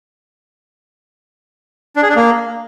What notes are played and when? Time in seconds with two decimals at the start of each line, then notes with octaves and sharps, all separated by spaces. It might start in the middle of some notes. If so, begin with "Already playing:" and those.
1.96 D4
2.03 G#4
2.09 D4
2.16 A#3